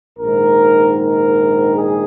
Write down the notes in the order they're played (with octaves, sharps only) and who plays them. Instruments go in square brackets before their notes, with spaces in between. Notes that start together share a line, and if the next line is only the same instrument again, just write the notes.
[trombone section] A#1 G#2 D#3 A#4
A#4
G#4